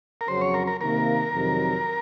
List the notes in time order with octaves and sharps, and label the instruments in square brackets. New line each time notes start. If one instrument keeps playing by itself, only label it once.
[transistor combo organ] A#4
[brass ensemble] F2 C#3 F#3 C#4 F#4 [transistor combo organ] C5
[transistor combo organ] C#5
A#4
A#4
[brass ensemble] C3 D#3 A#3 [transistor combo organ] A#4
[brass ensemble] F2 C3 D#3 F#3